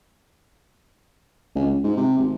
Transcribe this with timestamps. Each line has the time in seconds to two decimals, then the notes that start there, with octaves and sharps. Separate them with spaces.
1.55 C#2
1.66 C#2
1.83 G#2
1.97 C3
2.18 G#1